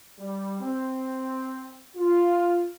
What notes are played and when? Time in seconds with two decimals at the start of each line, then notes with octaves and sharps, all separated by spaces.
0.19 G3
0.60 C4
1.96 F4